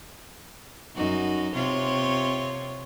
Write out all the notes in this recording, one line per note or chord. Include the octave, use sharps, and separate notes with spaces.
F#2 D#4 F#4
C3 F4 C#5